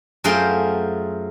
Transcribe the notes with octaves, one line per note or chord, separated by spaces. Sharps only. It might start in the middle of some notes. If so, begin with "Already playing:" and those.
F#2 A3 F4 G#4 C5 G5